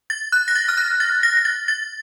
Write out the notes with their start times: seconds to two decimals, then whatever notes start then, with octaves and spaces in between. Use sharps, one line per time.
0.10 A6
0.32 F#6
0.48 A#6
0.55 A6
0.68 F6
0.77 F#6
1.00 A6
1.23 A#6
1.37 A#6
1.45 A6
1.68 A6